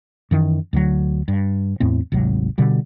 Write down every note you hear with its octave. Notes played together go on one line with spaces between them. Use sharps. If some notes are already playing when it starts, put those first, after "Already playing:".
F#2 D#3 E3
D2 D3 E3 F#3
G2
E2 A2 A3 C4
G#1 D2 C3 F#3
B2 D3 G3